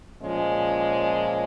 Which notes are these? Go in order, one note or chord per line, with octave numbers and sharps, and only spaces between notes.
A#2 F3 G#3 C#4